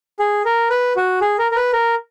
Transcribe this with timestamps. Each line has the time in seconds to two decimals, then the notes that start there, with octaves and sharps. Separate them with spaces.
0.19 G#4
0.45 A#4
0.70 B4
0.96 F#4
1.21 G#4
1.39 A#4
1.51 A#4
1.56 B4
1.73 A#4